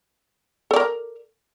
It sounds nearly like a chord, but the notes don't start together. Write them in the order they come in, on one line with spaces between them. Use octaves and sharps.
A4 D5 A#4